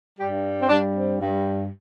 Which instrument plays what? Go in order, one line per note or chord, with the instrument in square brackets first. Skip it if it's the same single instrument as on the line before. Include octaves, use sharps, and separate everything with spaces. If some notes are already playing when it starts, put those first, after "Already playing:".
[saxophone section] G2 G3 G4
C4
G2 G3 D4
C4
G2 G3